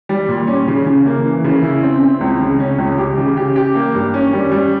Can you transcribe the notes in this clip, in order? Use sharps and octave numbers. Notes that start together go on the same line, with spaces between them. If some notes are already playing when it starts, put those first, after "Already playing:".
G3
A#2
C#4
C#3
C#3
A#3
E3
C#3
E4
C4
C4
C#2
C#3
C#4
C#2
G4
C#3
G4
G4
A#3
G2
C#4
G3
G3